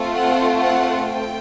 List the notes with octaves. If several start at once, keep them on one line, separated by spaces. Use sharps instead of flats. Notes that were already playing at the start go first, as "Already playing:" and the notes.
Already playing: A3 C4 F4
F#5
F#5
G5